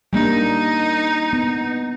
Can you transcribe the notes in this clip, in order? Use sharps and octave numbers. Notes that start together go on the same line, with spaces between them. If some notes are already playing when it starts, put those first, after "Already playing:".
G3 A#3 D4 D#4
B3